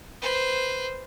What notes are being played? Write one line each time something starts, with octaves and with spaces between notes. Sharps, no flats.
B4 C5